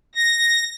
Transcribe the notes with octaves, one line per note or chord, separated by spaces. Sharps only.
A#6